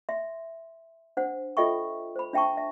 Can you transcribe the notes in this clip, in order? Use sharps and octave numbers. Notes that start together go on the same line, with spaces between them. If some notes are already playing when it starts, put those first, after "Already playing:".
E5 C6
D4 C5 F#5
F4 A4 D#5 E5 G5 C#6
C5 B5
D4 E5 G5 A5 C#6
E5